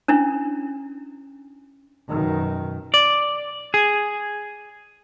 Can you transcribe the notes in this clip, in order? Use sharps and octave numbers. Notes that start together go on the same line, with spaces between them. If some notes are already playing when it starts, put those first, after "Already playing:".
C#4 D4 E4
F#2 B2 D#3
D5
G#4